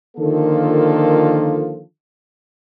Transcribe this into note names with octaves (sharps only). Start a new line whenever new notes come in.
D3 D#3 F3 A#3 F4 A4